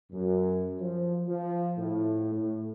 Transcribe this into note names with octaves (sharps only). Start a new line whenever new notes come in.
F#2
F3
F3
A2
A2